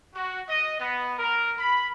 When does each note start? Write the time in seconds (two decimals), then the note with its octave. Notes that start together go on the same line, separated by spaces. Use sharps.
0.15 F#4
0.48 D#5
0.80 B3
1.18 A#4
1.59 B5